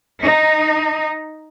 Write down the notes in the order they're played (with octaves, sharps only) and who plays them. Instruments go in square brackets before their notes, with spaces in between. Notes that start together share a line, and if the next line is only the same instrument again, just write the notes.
[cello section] D#4